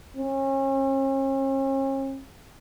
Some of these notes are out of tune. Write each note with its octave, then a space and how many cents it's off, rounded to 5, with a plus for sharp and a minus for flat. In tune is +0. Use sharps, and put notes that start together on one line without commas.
C#4 -40